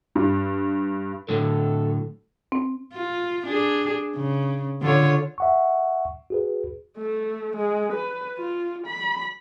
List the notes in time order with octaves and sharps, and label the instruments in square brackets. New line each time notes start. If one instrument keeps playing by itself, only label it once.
[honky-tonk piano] G2
[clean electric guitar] A2 D3 F#3 [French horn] A4
[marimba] C4
[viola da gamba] F4
D4 G#4
C#3
D3 F4 C#5
[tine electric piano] E5 F#5 C#6
F#4 G#4 B4
[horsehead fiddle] A3
G#3
B4
F4
B5